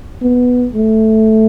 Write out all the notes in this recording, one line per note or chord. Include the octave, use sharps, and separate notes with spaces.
B3
A3